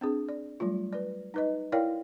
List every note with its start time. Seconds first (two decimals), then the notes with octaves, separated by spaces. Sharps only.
0.01 C4 D4 G#4
0.29 D5
0.60 F#3 G3 A3 F4
0.93 B4 D5
1.34 D#4 B4 D#5
1.72 E4 A#4 C#5 D5 F5 G5